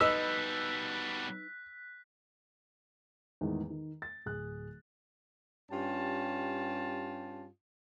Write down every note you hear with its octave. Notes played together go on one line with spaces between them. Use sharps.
B2 G3 D#4 B4 D#5 E6 F#6 B6
E2 A2 D#3 G#3
D#3
A6
D1 G#4 F#6
G2 C#4 F4 G4 A5